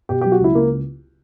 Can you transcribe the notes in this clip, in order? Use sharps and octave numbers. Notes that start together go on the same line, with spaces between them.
B2 G4
F#3 G4
F#4
C#2 E4
C#2 A#3